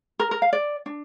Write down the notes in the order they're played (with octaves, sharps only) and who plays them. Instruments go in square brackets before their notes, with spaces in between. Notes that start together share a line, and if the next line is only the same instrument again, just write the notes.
[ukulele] A#4
A#4
F5
D5
D4